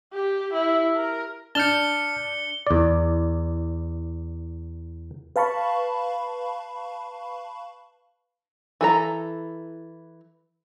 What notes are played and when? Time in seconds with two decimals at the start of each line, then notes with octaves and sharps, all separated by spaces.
0.13 G4
0.54 E4
0.96 A#4
1.55 D4 A5 F6 G6 C#7 G7
2.67 E2 D5
5.36 B4 F5 A5 B5 C#6
8.81 E3 A4 A#5